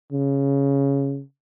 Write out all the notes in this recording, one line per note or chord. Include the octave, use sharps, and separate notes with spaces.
C#3